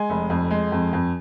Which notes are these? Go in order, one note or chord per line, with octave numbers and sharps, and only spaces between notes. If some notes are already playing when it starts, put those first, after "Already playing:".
Already playing: G#3 G#5
F1
F2
G#3
F2
F2